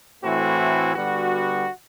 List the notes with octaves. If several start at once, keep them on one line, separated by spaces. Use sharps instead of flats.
A2 E3 A3 C4 F#4
D3 G3 B3 F#4